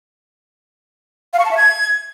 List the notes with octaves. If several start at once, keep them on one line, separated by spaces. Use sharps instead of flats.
F5
C#6
A5
E5
G#6